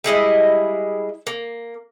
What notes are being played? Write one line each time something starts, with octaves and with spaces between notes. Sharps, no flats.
G3 G#3 E4 D#5
A#3